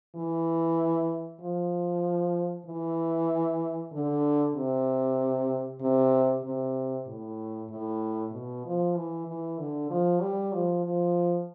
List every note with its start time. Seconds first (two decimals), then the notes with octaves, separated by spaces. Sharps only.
0.15 E3
1.41 F3
2.67 E3
3.92 D3
4.56 C3
5.81 C3
6.44 C3
7.07 A2
7.70 A2
8.33 B2
8.65 F3
8.96 E3
9.28 E3
9.59 D3
9.90 F3
10.22 G3
10.53 F3
10.85 F3